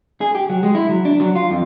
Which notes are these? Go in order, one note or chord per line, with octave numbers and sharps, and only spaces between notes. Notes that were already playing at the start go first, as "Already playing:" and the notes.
G#4
G4
F#3
G#3
E4
F#3
D4
F#3
F4
F2